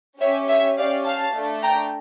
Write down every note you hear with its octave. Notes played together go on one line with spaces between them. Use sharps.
C#4 G4 C#5 E5
C#5 E5
C#4 G4 D5 F5
F5 A5
A3 D4 A4
G5 A#5